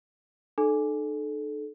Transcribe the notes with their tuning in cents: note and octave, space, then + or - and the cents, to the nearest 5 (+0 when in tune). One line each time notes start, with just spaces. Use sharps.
D#4 -45 A4 -25